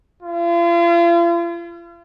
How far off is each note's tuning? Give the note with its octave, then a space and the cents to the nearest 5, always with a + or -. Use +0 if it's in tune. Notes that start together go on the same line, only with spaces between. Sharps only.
F4 -40